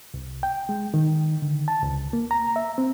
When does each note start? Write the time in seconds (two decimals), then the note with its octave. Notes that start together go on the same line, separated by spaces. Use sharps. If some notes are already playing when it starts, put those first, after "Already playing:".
0.14 C2
0.43 G5
0.69 G#3
0.94 D#3
1.42 D3
1.68 A5
1.83 C#2
2.13 A#3
2.31 A#5
2.56 E5
2.78 C4